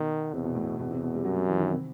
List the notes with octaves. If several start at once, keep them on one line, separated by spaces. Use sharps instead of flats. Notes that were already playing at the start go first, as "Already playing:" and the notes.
Already playing: B2 D#3
E2 C3
B2
A2
B2
E2 B2
C3
B2
G3
F#2 F#3
F#3
E3
D#3
C3